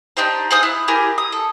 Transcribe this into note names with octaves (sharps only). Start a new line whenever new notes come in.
D4 D#4 G4 C5
G#4 C5 F5 D#6
E4 F#6
E4 G4 G#4 A#4
D#6
A4